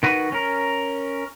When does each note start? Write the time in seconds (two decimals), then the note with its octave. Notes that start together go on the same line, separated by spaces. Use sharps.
0.03 D#3 F#4 B4
0.32 C#4 A#4